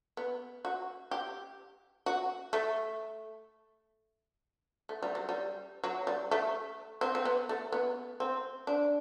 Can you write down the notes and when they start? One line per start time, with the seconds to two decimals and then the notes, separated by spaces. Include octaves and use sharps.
0.17 B3
0.65 F#4
1.11 G4
2.06 F#4
2.53 A3
4.89 A3
5.02 G3
5.15 F#3
5.29 G3
5.84 F#3
6.07 G3
6.31 A3
7.01 C4
7.15 C4
7.25 B3
7.49 A3
7.72 B3
8.20 C4
8.67 D4